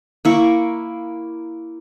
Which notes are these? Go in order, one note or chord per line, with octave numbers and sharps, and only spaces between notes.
A#3 E4 C#6